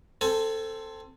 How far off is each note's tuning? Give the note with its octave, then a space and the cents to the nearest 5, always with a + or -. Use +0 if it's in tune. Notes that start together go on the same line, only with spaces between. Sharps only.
C4 +0 A4 +15 G#5 +35